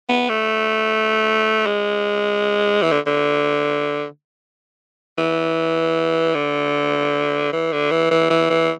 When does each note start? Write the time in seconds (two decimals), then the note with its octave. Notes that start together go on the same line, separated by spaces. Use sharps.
0.09 B3
0.29 A3
1.66 G#3
2.83 E3
2.91 D3
3.06 D3
5.18 E3
6.35 D3
7.53 E3
7.72 D3
7.91 E3
8.11 E3
8.30 E3
8.50 E3